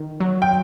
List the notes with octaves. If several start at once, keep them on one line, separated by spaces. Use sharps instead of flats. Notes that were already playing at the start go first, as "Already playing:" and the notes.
Already playing: D#3
F#3
G5